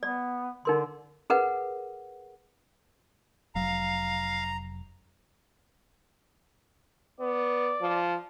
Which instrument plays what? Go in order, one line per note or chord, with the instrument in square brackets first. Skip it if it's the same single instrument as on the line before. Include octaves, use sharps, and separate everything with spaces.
[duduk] B3 [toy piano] D5
[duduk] D3 [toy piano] D#4 A#4 C6
[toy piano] G#4 A#4 B4 F#5
[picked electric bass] F1 F#3 [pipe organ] F5 [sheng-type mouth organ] A#5
[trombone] B3 [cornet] D5
[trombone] F3